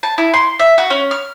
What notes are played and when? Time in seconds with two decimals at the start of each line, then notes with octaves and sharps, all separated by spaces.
0.03 A5
0.18 E4
0.34 C6
0.59 E5
0.78 F#4
0.90 C#4
1.11 F6